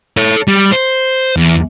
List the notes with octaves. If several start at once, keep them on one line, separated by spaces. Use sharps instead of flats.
A4 C#5
G3
C5
E2